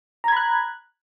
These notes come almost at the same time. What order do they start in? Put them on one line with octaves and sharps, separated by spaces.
A#5 G#6 B5 F#6